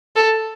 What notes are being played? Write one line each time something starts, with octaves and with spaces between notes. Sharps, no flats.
A4